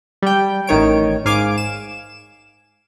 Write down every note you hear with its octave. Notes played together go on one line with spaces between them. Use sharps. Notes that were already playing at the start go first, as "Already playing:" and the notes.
G3 G5
A1 D#3 C#5 D7
G#2 F5 G#5 D6 D7
E7